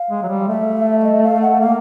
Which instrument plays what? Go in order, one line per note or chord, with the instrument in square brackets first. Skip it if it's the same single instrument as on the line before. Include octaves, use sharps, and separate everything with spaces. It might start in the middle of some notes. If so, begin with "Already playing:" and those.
Already playing: [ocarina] F5
[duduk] G#3
F#3
G3
[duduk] A3 [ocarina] E5
[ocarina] E5
D#5
F5
F#5
[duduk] A#3 [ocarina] F5